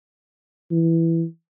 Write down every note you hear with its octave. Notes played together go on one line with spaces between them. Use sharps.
E3